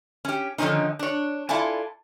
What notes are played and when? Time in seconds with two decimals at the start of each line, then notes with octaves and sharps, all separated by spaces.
0.25 C#4 G4
0.58 D3 D#3 F3 C4 C#4 D#4
0.99 D4 C#5
1.49 E4 F4 A4 D5 G#5 A5